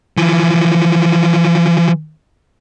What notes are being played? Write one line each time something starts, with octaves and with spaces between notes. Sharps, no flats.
E3 F3